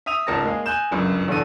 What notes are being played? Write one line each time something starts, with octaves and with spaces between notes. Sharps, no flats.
E5 D#6 D#7 F7
G#1 C#2 A#4 A5 A#6
G#3 A#3 G#4 F5
G#5 F#6 G6 E7
G1 C#2 F#2
E2 B2 D4 A4 D5 D#7